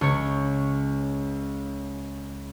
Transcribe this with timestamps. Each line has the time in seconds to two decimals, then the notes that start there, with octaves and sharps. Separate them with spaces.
0.01 C#2 C#5